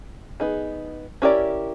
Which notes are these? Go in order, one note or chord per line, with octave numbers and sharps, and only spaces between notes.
B3 D#4 G#4
C#4 E4 G4 A#4 D5